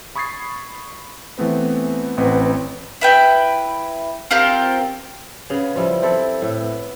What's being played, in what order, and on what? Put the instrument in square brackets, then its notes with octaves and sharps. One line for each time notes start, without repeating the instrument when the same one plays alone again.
[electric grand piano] B5 C#6 D#6 G#6 A6 C7
E3 A3 B3 C4 B4
A1 C4 B4 F#5
[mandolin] E4 B4 G5
C4 F4 G4 A#4
[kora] C#3 B3 G#4
F3 G3 E4
C4 E4 A4 D5
A2 E5
B3